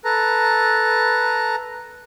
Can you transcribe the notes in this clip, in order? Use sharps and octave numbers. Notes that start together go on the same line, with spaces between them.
A4 B4 A#5